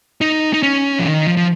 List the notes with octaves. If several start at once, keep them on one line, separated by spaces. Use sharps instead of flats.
D#4
D#4
C#4
F3
D#3
F3
F3